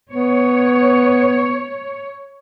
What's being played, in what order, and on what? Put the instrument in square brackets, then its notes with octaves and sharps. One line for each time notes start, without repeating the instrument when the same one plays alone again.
[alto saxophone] B3 [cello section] C#5